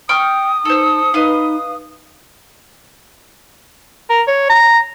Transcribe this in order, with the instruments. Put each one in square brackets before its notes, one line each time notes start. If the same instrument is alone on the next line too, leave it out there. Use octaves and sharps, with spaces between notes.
[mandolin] G5 C#6 F6 [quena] D#6
[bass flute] D#4 [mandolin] A4 C5
[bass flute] D#4 [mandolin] B4 D#5 F5
[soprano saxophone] A#4
C#5
A#5